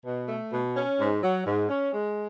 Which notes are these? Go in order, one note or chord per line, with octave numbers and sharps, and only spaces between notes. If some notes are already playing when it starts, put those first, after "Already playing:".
B2
A3
B2
C#4
G#2
F#3
G#2
C#4
G#3